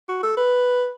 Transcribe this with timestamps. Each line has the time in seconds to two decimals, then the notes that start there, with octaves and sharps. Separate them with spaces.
0.09 F#4
0.23 A4
0.37 B4